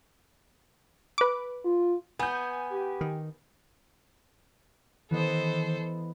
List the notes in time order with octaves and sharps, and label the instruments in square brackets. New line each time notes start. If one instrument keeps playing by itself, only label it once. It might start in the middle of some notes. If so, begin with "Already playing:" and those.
[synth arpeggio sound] B4 D6
[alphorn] F4
[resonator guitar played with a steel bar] B3 [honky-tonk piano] G#5 G6
[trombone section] G4
[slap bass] D#3
[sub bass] D#3 [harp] E3 B3 D#5 [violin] A4 C5